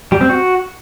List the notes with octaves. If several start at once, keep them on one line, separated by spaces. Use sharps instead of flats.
G3
C4
F#4